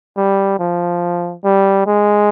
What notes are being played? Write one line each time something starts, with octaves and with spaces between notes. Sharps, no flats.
G3
F3
G3
G#3